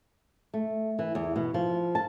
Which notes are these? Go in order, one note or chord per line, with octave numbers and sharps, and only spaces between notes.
A3
E3
E2
B2
F3
A5